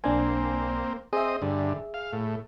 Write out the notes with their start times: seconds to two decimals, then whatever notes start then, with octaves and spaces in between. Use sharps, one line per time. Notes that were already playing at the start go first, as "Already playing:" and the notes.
0.04 B1 A#3 C4 D4 G#5
1.13 C4 G#4 D#5 E5
1.42 G2 D3
1.94 F5
2.13 A2